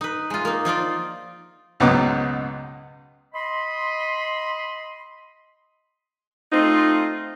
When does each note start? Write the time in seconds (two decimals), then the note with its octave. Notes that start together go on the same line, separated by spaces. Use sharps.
0.01 D#4 B4
0.30 G#3 F4
0.45 A#3 D#4
0.65 F3 D#4 F4 D5
1.80 C#2 G#2 B2 F#3 B3 D6
3.33 D#5 B5 C6
6.52 A3 C4 D#4 F4